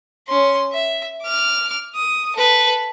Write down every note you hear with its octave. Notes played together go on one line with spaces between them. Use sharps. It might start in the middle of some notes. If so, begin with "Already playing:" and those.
C#4 C6
E5
D6 F6
D#6
A4 B4